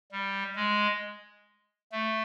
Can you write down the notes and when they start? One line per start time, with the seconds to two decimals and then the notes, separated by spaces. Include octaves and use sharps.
0.12 G3
0.56 G#3
1.92 A3